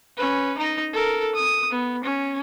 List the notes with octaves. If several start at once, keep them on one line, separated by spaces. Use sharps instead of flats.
C#4 B4
D#4 A#5
A4 A#4
D#6
B3
C#4